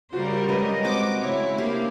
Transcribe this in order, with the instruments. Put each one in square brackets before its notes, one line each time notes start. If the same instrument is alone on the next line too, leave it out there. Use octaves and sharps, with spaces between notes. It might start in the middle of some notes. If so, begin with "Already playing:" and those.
[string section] C#3 G3 A#4 [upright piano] F#4 [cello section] C5
[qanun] F#3 [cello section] G#3 D#5 [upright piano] B4
[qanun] C4 F#4 [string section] D6
[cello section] C#3 A3 E4 [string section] C#5
[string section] A#3 D4 F5 [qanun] G4